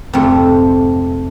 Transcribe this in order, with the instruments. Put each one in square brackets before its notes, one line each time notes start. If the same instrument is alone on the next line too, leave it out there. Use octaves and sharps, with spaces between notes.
[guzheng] F2 G#2 C3 A3 D4